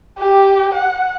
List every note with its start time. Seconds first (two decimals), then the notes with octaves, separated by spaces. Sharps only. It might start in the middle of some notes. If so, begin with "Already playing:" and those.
0.18 G4
0.75 F#5